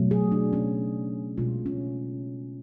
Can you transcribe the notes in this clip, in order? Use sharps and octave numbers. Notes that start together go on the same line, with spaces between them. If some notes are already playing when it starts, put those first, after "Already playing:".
Already playing: B2 F#3 A3
G#4
D4
C#4
B2 G#3 F4
C#4